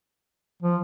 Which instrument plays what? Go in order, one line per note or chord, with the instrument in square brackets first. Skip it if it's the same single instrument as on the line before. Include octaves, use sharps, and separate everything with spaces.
[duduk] F3